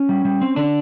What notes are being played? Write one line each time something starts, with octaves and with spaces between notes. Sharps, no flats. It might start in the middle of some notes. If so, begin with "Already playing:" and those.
Already playing: C#4
G3
G3
C4
D3 D4